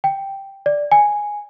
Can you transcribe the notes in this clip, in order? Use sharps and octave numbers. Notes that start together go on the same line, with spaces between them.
G5
D5
G#5